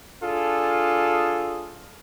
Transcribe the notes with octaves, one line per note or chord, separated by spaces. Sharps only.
D4 F4 G#4 A4